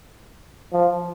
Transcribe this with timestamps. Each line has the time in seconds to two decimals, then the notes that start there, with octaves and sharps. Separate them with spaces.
0.73 F3